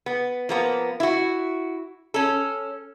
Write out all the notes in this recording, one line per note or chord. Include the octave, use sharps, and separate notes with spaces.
B3
F3 A#3 B3
E4 F#4
C#4 A4